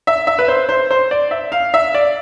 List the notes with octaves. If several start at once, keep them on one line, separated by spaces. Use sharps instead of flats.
E5
E5
B4
C5
C5
C5
D5
E5
F5
E5
D5